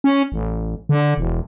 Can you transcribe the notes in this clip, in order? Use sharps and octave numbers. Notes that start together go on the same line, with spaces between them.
C#4
A1
D3
E1